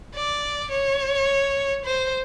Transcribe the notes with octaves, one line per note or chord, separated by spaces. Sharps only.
D5
C#5
C5